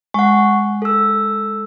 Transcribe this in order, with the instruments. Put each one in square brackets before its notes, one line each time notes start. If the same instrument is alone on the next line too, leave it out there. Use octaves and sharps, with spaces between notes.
[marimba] G#3 [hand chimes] F#5 C#6
[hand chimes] A4 E6